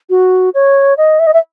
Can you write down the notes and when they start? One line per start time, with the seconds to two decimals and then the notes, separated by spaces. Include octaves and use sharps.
0.10 F#4
0.54 C#5
0.97 D#5
1.19 E5
1.27 D#5
1.33 E5